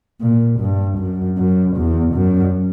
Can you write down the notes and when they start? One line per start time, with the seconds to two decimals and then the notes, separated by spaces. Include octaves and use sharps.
0.21 A#2
0.60 G2
0.98 F#2
1.37 F#2
1.76 E2
2.15 F#2